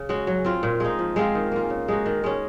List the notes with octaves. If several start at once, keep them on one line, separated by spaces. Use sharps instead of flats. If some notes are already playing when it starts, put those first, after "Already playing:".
Already playing: C#3
G#3 C#4 F#4
F#3
C4 F4
A#2
G#3 D#4
F3
G#3 C4 F4
D#3
A#3 F4
C#3
G#3 D#4 F#4
D#3
G#3 C#4